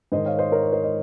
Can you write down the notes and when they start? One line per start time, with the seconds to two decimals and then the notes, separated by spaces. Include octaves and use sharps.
0.12 G#2 D#3 C5 D#5
0.25 C#5 F5
0.38 C5 D#5
0.52 A#4 C#5
0.63 C#5
0.72 C5 D#5
0.83 D#5